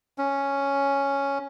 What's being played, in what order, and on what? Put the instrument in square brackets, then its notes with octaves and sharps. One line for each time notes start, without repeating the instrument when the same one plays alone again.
[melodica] C#4